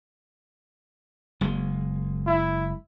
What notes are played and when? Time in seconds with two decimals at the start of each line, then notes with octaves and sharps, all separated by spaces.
1.41 F#1 G#3
2.27 E4